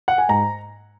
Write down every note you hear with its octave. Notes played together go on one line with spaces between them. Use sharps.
F#5
G#5
G#2 A#5